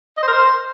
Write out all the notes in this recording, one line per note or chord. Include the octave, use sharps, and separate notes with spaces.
D#5
C5
A#4
C5